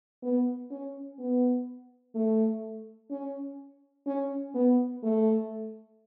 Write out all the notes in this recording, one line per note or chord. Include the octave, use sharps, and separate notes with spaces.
B3
C#4
B3
A3
C#4
C#4
B3
A3